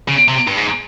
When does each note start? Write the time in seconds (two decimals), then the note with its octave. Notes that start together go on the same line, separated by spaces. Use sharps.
0.08 C#3
0.28 C3
0.47 G2
0.57 G#2